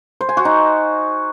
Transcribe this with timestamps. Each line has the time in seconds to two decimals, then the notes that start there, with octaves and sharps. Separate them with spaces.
0.21 C5
0.29 G#5
0.37 F#4
0.45 D#4